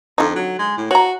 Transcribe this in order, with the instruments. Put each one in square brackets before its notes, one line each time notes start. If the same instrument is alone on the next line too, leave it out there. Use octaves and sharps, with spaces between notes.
[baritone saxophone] F2 [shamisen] D3 D#4
[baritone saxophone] F#3
G#3
A2
[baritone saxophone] F#4 [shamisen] C#5 A#5